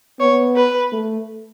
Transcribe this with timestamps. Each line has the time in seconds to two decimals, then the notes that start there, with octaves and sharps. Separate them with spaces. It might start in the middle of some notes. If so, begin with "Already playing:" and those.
0.20 B3 C#5
0.56 B4
0.93 A3